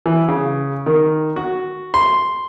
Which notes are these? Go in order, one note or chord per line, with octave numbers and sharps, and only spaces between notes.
E3
C#3
D#3
F#4
C6